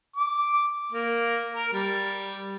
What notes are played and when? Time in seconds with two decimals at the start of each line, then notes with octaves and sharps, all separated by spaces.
0.16 D6
0.92 A#3
1.54 A#4
1.73 G3